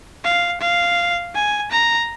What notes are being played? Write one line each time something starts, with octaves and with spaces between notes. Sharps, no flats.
F5
F5
G#5
A#5